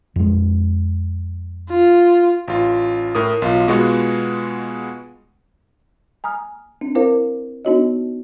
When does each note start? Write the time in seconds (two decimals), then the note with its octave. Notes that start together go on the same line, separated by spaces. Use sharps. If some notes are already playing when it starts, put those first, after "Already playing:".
0.16 F2 G#3
1.70 F4
2.48 A1 F4
3.15 A2 A#4 D#6
3.42 B1 F4
3.68 B2 G#3 B3 F4 F#4
6.24 G#5 A#5 D#6 F6
6.81 C4 D4
6.95 C4 E4 A#4 C5 F5
7.65 B3 D4 D#4 F#4 C#5 D#5